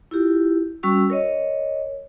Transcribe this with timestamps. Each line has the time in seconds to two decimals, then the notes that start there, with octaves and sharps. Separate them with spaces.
0.11 E4 F4 G4
0.83 G3 C#4 F#4 C#6 E6
1.10 A#4 C#5 D#5